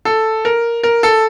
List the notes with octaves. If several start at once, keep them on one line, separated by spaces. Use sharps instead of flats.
A4
A#4
A#4
A4